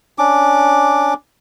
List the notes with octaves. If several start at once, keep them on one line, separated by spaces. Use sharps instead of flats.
C#4 D4 D6